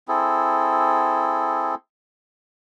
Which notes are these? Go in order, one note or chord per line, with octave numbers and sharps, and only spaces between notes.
C4 E4 G#4 A4